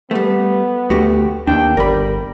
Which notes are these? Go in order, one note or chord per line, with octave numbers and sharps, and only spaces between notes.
G3 A3 B3
D2 A3 F#4 G4
D#2 D4 G5
G1 G3 A#4 B5